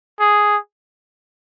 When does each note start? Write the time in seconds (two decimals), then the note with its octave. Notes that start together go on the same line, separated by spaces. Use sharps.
0.20 G#4